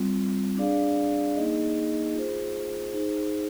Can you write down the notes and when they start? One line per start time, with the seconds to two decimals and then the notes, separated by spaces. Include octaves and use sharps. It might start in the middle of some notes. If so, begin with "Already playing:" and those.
Already playing: G3 C4 F4
0.57 D4 G#4 D5 F5
1.36 A#3 D#4 G#4 D#5
2.15 F4 G#4 C5
2.94 D#4 G#4 C5